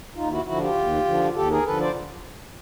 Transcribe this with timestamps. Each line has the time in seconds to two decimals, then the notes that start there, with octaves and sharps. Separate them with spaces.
0.15 D#2 D#4 F4
0.30 E4 F#4
0.45 D3 F3 E4 F#4
0.60 F4 G4
0.75 D#2
1.05 D3 F3
1.35 D#2 G4 A4
1.50 G#4 A#4
1.65 D3 F3 A4 B4
1.81 C5 D5